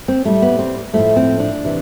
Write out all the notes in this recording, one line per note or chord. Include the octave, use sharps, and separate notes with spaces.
C4
A2 G3 A3
B3
C4
A2 F3 A3
C4
D4
C3 E3